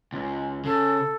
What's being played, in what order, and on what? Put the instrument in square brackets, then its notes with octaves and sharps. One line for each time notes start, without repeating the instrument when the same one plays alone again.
[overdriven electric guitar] C#2
[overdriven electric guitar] C#3 [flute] A4